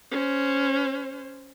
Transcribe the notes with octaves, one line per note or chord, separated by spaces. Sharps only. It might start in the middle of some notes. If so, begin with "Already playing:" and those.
C#4 C5